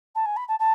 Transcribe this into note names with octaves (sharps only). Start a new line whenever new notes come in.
A5
G#5
B5
A5
A5